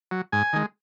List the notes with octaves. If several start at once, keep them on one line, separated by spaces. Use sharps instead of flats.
F#3
G#2 G#5
D#3 G#3